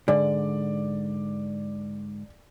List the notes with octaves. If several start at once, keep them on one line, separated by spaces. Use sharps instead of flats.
G#2 D3 D5